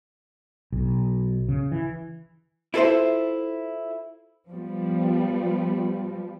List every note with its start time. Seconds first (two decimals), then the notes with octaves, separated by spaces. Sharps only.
0.72 B1
1.48 C#3
1.72 E3
2.74 E4 F4 A4 A#4 C5 E5
4.48 F3 G3 B3